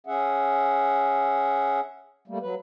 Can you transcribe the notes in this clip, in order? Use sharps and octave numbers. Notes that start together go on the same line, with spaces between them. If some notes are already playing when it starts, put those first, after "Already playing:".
C#4 G#4 E5 F#5
G3 A3 A#3
F#3 B4